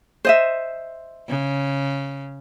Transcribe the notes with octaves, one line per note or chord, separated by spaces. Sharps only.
C5 D#5 E5
C#3